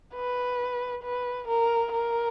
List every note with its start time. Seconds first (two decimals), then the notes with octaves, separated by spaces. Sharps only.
0.14 B4
1.03 B4
1.47 A#4
1.92 A#4